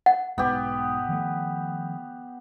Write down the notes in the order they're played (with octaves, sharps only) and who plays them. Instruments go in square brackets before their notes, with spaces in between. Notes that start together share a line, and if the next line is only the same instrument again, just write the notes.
[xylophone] F#5
[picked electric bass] B1 G#2 [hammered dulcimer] B3 G4
[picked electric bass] D#3 F3 A3